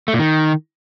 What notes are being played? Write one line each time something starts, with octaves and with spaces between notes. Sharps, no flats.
A3
A#2
D#3